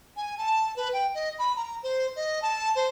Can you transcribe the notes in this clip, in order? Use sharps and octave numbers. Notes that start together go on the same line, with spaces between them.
G#5
A5
B4
G5
D#5
B5
A#5
C5
D#5
A5
C5